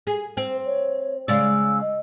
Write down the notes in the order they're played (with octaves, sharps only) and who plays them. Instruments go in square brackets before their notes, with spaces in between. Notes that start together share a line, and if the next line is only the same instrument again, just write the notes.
[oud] G#4
[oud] C4 [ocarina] C5
[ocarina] C#5
[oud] C#3 G#3 D5 [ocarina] E6
[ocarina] D#5